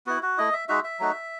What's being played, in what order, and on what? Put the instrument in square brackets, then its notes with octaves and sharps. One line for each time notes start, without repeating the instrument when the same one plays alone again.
[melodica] B3 E4 F#4
F#4
A3 E4 D#5
E5
G#3 D#4 F#4 E5
E5
F#3 A3 D#4 F#4